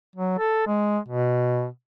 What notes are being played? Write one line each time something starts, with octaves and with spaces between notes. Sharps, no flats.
F#3
A4
G#3
B2